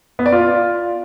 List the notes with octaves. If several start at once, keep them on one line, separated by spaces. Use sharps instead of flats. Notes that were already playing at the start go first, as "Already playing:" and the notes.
B3
D5
F4